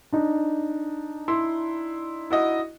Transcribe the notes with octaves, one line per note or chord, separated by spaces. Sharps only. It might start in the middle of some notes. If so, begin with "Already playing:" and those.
D4 D#4
E4 C6
E4 F#4 D#5